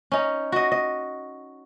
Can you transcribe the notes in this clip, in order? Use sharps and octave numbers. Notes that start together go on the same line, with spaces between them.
C#4 D#4
F#4 D#5
D#5